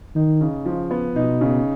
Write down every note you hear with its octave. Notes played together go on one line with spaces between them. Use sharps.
D#3 D#4
C#3
F3
B3
B2 D#4
C#3